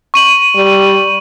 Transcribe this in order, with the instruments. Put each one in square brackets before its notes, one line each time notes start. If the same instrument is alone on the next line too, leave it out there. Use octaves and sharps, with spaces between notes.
[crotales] C#6 D#7 F#7
[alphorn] G3